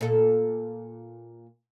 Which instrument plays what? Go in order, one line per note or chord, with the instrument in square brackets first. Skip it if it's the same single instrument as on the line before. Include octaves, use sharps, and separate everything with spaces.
[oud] A#2 A4